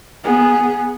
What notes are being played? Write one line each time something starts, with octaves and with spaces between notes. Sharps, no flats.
B3 G#4